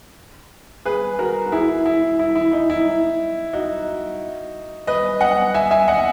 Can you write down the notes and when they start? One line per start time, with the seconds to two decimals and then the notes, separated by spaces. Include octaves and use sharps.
0.85 G#4 B4
1.19 F#4 A#4
1.46 F#4
1.52 E4 G#4
1.86 E4
2.19 E4
2.35 E4
2.53 D#4
2.70 E4
3.53 D#4 F#4
4.87 B4 D#5
5.21 D#5 F#5
5.54 E5 G#5
5.71 E5 G#5
5.88 D#5 F#5